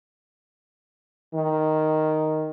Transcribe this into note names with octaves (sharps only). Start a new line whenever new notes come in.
D#3